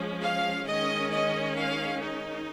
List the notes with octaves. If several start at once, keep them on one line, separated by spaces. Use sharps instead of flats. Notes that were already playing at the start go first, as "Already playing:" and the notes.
Already playing: F3 G#3 C#4
F5
D#3 G#3 C#4 D#5
D#5
F5
D#4